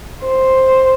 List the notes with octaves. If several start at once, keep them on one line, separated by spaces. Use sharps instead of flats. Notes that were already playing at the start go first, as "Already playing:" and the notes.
C5